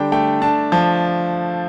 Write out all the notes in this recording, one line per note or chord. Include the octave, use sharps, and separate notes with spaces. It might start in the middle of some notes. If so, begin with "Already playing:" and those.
Already playing: D3 G3 D4 G5
A3 G5
D4 A5
F3 A5